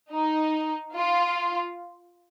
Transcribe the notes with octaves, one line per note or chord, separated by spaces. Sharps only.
D#4
F4